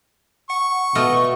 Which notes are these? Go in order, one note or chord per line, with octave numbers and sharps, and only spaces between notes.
F#5 C#6
B2 A3 F4 D#5